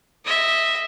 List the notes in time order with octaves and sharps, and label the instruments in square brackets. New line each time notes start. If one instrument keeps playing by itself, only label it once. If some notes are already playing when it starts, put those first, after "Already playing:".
[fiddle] D#5 E5